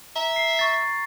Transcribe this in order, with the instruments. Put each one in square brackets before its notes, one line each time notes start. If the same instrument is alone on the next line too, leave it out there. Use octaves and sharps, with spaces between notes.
[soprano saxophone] E5 [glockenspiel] A#5
[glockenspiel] C7
C#6 A6